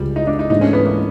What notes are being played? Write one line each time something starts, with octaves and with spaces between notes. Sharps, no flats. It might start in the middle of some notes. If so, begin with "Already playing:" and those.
Already playing: C#2 C#3 G3
D#4
D4
D#4
G#2 E3 A3 D4 D#4
C#4
B3
A#3